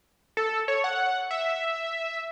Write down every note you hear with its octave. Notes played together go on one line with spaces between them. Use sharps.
A4
C#5
F#5
E5